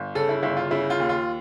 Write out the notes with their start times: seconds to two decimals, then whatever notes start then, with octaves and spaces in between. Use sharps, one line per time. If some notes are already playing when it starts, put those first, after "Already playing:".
Already playing: G1
0.15 C#3 A4
0.29 E4
0.43 G1 E4
0.57 F4
0.71 C#3 E4
0.90 F4
1.00 D#2
1.09 F4